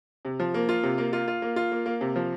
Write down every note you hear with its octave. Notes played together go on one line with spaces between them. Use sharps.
C3
F3
A#3
F4
C3
A#3
F4
F4
A#3
F4
A#3
A#3
C3
F3